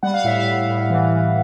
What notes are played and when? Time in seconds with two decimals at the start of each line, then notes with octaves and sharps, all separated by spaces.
0.03 G3 F#5
0.14 F5
0.24 A2 E5
0.37 F5
0.47 A2
0.69 A2
0.90 E3
1.13 E3